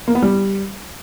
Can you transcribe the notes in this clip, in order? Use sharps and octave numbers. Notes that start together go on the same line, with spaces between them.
A#3
B3
G3